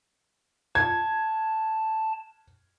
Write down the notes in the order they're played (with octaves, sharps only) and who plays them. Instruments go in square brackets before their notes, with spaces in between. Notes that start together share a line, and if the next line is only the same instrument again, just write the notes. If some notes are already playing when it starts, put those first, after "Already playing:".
[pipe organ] A5 [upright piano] G#6